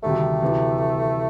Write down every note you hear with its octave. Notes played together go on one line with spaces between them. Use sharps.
D2 C3 D#3 G3 A3
D2 C3 E3